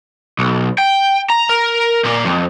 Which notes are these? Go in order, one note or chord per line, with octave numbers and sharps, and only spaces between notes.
B1
G5
A#5
A#4
A#2 A#3
F2